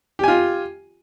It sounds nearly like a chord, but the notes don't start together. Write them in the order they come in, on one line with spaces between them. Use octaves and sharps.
G4 G#5 F4